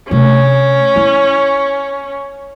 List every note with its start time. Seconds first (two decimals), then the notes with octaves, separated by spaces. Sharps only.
0.11 C3 A3 C#4
0.96 E4